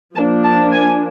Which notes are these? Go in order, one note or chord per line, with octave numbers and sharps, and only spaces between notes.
F3 A#3 D4 A5
A5
G#5